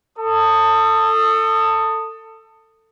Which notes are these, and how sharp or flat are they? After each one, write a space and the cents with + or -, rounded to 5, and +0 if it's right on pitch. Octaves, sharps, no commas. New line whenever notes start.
A4 +20 D#6 -5